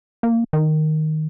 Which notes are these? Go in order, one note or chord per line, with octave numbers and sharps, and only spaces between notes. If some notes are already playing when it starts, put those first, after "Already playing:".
A#3
D#3